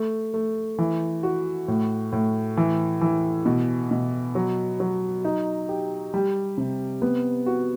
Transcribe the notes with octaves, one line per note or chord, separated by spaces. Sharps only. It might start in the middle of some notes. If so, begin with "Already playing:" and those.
Already playing: A3
A3
E3
F#4
A2
A2
E3
E3
B2
B2
F#3
F#3
D#4
G4
G3
C3
B3
F#4